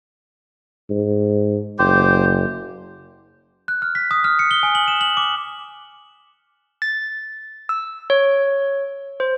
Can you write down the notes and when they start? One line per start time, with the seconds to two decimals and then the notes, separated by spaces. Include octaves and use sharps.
0.90 G#2
1.79 F#1 G4 C5
3.68 F#6
3.82 F6
3.95 B6
4.11 D#6
4.24 F6
4.39 C#7
4.51 G7
4.63 G#5
4.75 F#7
4.88 E7
5.01 F#7
5.17 D6
6.82 A6
7.69 E6
8.10 C#5
9.20 C5